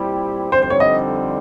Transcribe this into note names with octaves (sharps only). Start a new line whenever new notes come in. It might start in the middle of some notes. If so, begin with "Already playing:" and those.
Already playing: A#2 G3 C4 E4 G4
F2 D3 G3 C4 D#4 C5
C5
C#5
D#5